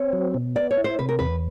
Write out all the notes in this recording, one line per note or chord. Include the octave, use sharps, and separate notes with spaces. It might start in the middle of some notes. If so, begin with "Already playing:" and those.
Already playing: C4 C#5
F#3
B2
B3 D5
C#5
E4
C5
C3 B4
A#4
E2 B4